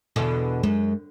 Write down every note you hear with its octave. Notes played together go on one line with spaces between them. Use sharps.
E2 B2 D3
F#2 G#3